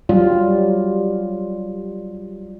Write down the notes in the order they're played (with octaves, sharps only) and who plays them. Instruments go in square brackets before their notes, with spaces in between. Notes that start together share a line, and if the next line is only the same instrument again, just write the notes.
[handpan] F#3 G3 F4